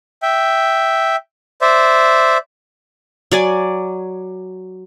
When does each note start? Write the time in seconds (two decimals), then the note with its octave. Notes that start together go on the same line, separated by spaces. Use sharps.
0.22 E5 G5
1.61 C5 D5 E5
3.31 F#3 D5 G#5